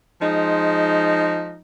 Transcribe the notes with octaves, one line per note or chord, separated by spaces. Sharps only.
F3 G#3 D#4